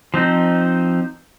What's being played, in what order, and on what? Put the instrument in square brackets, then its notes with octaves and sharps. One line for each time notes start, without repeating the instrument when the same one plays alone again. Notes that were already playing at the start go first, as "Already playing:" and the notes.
[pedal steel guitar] F3 C4 D#4